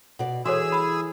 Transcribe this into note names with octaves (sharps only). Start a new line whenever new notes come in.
B2 D5
E3 F#4 G#4 A4 C#5 E6
B5 D#6